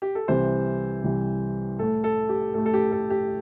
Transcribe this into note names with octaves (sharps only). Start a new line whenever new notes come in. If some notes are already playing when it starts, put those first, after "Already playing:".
G4
A4
C2 C3 E3 C5
C2 C3 E3
A2 A3 A4
A4
G4
A2 A3 A4
A4
G4
A4
G4